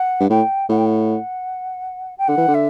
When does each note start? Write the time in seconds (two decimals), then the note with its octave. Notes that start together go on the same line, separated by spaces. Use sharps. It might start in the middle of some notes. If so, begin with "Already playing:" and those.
Already playing: F#5
0.20 G2
0.29 A2 G5
0.69 A2 F#5
0.77 G5
0.85 F#5
2.18 G5
2.27 D3 F#5
2.38 E3
2.48 D3
2.54 E5